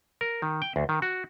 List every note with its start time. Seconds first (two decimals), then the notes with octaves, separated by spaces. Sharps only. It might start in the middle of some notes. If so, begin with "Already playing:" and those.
0.21 A#4
0.42 D#3
0.62 G5
0.76 D2
0.89 D#3
1.02 F#4